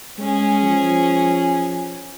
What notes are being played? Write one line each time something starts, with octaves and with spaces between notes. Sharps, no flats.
G#3 C#4 G#4
F3